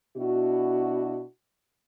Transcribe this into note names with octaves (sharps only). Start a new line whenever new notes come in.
B2 D4 E4 F#4